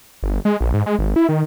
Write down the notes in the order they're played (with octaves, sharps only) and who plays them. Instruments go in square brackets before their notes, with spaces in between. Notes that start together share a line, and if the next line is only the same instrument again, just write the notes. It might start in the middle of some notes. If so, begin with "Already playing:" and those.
[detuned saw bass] G1
G#3
A#1
G#2
G#3
G#1
E4
D#3